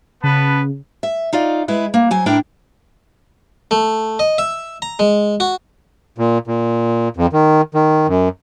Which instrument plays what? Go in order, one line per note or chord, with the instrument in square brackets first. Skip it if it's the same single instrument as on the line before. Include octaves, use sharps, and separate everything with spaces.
[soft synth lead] C#3 [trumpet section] B3 B4 A5
[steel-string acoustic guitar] E5
D#4 F4 D5
G#3 E4 B4
A#3
F#3 C5 G#5
A2 D4 E4 A#4 G5
[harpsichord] A3
D#5
E5
A#5
G#3
F#4
[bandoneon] A#2
A#2
F2
D#3
D#3
F#2